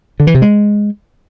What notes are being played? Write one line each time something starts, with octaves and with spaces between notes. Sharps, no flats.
D3
E3
C3
G#3